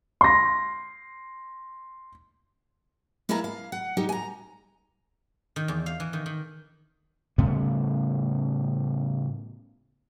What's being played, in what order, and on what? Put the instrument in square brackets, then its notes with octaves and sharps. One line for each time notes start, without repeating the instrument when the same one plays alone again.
[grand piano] C6 A#6
[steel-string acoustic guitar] A#3 E4 A#4 B4 A5 A#5
F5
F#5
G3 D#4 G4
G#5 A#5
[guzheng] D#3
E2
F5
E3
D#3
D#3
[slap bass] A2 C#3 G3 B3